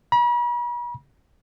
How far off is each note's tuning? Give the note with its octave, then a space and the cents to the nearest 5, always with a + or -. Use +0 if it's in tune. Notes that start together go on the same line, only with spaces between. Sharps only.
B5 -45